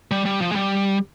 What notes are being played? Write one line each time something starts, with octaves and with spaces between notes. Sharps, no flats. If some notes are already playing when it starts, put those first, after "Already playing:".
G3
G3
F3
G#3
G3